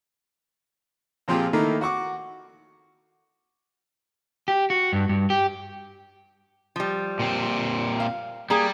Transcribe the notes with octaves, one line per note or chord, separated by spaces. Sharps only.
A#2 F3 C4 F4 G4 G#4
D#3 A3 A#3 E4
F#4 F#5 C#6 D6
G4
F#4
G2
G2
G4
F3 G3
A#2 C4
F5
G3 A#3 G#4